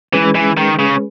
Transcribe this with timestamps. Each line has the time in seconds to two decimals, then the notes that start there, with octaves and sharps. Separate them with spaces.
0.13 E3 G#3 C#4 G#4 B4
0.35 E3
0.57 D#3
0.79 C#3